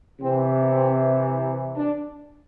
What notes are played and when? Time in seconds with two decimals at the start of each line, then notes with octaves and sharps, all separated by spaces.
0.20 C3 E3 C4
0.72 C4
1.76 D4